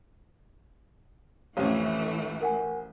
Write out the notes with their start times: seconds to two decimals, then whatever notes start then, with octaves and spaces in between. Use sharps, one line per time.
1.57 A1 F2 E3 A3 C#4 C#5
2.41 A#4 F#5 G#5